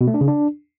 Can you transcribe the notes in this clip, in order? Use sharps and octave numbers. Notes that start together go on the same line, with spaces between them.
B2
A3
D4
C#3
D4